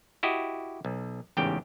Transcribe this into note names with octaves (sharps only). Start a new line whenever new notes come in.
E4 F#4 G4 D#5
B1
A1 E2 G#2 C#3 G4 G5